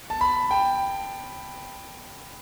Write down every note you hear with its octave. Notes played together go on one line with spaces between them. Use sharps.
A5
B5
G5